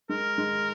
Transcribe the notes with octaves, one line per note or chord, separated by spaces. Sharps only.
G#3 A#4
G#3